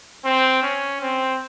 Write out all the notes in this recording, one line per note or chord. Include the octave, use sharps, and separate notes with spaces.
C4
C#4
C4